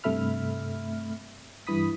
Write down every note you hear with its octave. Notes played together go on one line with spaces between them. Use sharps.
G2 C3 A3 E5 B5 F6
G2 E3 B5 D#6 B6